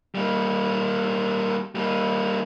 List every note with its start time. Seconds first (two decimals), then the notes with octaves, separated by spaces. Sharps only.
0.15 G3 A#3
1.75 G3 A#3